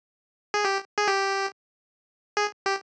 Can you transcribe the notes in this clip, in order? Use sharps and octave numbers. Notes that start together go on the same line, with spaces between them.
G#4
G4
G#4
G4
G#4
G4